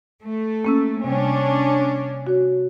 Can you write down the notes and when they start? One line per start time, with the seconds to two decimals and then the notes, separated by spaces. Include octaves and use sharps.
0.23 A3
0.65 A#3 C#4 E6
1.04 C3 G3 C#4 D4
2.27 F#4 C#5